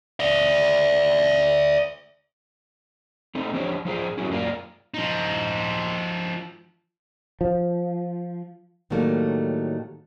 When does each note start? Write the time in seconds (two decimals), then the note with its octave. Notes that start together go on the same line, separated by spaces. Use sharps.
0.20 D5 E5
3.35 A3 C4 D#4
3.53 F3 D4 G4 C5 C#5
3.85 F3 F4 G#4 C5
4.17 F#3 C#4 E4 F#4 G4
4.30 F#2 A#3 F4 A#4 D5 F5
4.94 F3 D#4
7.41 F3
8.90 A2 D#3 F#3 G3 A3 A#3